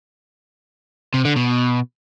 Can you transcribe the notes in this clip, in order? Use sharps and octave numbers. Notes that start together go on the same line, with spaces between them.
C3
D3
B2